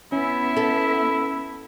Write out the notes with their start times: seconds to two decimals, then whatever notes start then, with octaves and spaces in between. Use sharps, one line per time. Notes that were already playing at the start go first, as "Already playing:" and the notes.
0.12 B3 C#4 E4 E5
0.57 A4